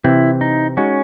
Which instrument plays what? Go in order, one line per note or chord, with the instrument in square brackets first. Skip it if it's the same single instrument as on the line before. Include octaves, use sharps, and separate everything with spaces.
[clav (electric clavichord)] C3 E3 C4 [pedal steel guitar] E4
[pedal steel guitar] D#4
[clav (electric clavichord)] G#3 D#4 F#4 [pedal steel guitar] C#4